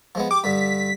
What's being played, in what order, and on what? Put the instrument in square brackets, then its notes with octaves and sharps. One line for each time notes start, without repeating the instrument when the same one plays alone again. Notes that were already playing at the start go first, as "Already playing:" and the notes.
[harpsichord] F3 G#3 B3
[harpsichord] G4 [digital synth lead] D6
[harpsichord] G2 D3 [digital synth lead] B6